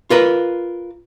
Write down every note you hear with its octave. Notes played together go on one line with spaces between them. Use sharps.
F4 A#4 B4